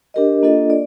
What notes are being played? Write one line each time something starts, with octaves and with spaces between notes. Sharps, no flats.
D4 G4 A#4 D#5
A#3 D4 F4 A4 D#5
D5